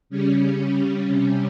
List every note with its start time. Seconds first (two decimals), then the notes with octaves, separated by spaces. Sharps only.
0.10 C#3 G3 C#4
1.04 C3 G3 C#4